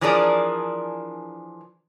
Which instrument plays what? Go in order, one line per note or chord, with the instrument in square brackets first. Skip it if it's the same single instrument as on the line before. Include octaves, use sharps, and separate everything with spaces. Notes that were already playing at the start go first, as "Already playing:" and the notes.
[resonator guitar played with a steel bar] E3 F3 D4 G#4 A#4 D5